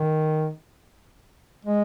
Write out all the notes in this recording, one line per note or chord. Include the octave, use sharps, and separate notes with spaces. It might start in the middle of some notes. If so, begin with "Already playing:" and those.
Already playing: D#3
G#3